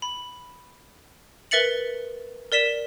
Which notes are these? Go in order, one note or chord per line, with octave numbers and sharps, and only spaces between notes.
B5
A#4 B4 E5 A6 C#7 F#7
A#4 D5 B6 E7